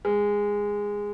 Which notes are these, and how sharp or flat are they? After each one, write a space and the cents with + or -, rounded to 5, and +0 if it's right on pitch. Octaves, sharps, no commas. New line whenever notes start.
G#3 -15